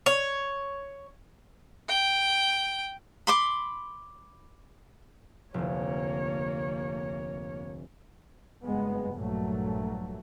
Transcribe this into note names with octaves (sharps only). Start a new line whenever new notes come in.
C#5
G5
B5 C6 D6
F1 D2 A#3 C#5
F#1 G2 G#3 B3
A#1 G2 A#2 F#3 A3